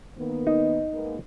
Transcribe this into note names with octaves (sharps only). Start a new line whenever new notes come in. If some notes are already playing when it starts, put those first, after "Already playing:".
D#3 A#3 B3
D#4
G#3 A#3 B3